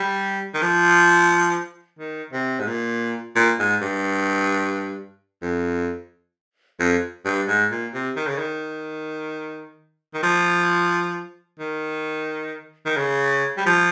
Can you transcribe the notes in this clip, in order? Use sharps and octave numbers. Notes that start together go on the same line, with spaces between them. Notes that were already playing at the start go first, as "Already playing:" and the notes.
Already playing: G3
D#3
F3
D#3
C3
G#2
A#2
A#2
G#2
G2
F2
F2
G2
G#2
A#2
C3
D#3
C#3
D#3
D#3
F3
D#3
D#3
C#3
G3
F3